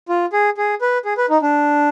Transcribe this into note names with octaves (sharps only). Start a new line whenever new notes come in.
F4
G#4
G#4
B4
G#4
B4
D#4
D4